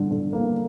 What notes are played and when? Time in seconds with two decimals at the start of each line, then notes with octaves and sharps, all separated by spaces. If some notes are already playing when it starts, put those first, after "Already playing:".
Already playing: D3 G3
0.11 D3
0.33 A#3